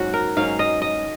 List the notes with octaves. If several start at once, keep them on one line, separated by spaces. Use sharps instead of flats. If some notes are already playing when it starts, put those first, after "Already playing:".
Already playing: G#2 F#3 C#4 F#4
A#4
G#2 F#3 C#4 F5
D#5
D#5